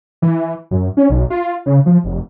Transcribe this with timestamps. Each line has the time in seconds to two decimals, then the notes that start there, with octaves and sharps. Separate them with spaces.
0.22 E3
0.71 F#2
0.97 C#4
1.10 B1
1.30 F4
1.66 C#3
1.86 F3
2.04 F1